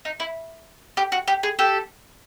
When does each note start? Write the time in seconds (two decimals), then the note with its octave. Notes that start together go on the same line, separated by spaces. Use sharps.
0.05 D#4
0.20 E4
0.97 G4
1.12 F#4
1.28 G4
1.43 G#4
1.59 G4 A4